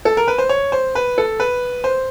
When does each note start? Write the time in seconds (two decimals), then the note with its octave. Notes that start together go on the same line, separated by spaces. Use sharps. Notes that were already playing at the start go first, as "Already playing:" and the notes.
0.05 A4
0.17 A#4
0.28 B4
0.38 C5
0.49 C#5
0.72 C5
0.95 B4
1.18 A4
1.40 B4
1.84 C5